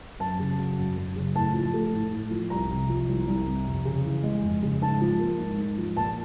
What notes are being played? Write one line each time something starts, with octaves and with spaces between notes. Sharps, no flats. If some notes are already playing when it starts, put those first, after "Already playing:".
F#2 A5
C#3
F#3
F#2
F#2
C#3
A2 A5
F3
A3
A2
A2
F3
C2 A#5
C3
F3
C2
C2
C3
F2
C#3
E3
G#3
F2
C#3
G#2 A5
F3
A#3
G#2
G#2
F3
A#2 A5